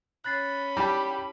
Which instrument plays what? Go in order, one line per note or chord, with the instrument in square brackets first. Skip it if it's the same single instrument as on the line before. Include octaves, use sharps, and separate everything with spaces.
[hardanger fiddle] C#4 B5 [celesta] F#6 A6 C7
[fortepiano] G3 [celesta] E4 A5 [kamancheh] G4